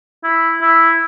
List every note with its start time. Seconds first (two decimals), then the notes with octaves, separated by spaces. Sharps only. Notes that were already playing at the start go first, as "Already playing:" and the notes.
0.24 E4
0.62 E4